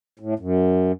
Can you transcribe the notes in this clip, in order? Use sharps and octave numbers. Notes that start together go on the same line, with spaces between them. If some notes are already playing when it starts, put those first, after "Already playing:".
A2
F#2